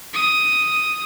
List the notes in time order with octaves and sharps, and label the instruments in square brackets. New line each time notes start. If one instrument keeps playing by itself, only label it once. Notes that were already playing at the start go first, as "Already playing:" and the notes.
[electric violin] D#6